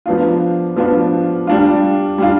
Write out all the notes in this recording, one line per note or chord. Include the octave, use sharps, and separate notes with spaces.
F3 B3 D4 F4
F3 B3 D4 F4
G3 D4 F4
G3 D4 F4